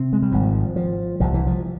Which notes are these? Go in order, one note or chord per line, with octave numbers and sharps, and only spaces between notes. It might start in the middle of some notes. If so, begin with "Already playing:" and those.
Already playing: C3 C4
G#3
G3
G#1 G#2 F3
F3
C2 C3 F3
E3
F3